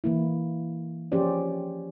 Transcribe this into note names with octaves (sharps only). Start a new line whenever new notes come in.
E3 A#3 E4
F3 C#4 G4 G#4 C5 D5